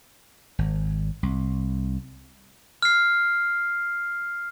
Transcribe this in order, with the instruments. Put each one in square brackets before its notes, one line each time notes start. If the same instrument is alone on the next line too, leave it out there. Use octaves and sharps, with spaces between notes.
[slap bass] G#1
C2
[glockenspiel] F6 C7